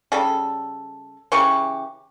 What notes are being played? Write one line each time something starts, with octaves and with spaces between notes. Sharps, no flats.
C#3 G3 A4
C#3 E3 G4 C#6